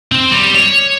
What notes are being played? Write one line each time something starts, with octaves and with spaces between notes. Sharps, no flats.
C4
G3
C#5